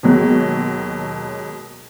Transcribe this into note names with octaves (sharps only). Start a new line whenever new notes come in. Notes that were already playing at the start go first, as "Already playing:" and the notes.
D#2 B2 F#3 G#3